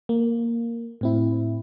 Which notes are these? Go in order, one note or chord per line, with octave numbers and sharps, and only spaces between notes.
A#3
A2 C4 E4